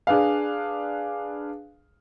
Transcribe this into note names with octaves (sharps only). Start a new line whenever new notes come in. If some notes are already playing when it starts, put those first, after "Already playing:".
D4 G#4 B4 F5